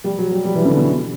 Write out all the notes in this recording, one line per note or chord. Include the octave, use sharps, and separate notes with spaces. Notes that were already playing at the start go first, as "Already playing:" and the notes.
G3
F#3
G3
G3
E3
D3
B2